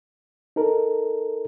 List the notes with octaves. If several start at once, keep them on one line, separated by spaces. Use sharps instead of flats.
D#4 A4 A#4